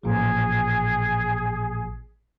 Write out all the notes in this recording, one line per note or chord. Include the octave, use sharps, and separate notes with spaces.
A1 A#2 F3 G#4